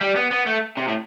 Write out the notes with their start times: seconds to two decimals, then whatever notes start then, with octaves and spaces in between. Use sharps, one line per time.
0.01 G3
0.16 B3
0.31 B3
0.46 A3
0.77 C3
0.88 A2